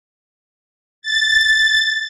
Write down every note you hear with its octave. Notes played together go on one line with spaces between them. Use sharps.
A6